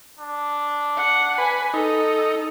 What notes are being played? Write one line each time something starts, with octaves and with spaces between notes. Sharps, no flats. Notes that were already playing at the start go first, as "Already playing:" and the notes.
D4
F#5
B4 G#5
D#4 A4